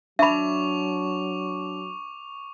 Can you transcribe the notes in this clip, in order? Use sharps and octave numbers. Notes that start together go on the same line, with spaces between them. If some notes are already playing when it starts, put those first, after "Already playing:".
F#3 D4 E5 B5 C#6 D6 F7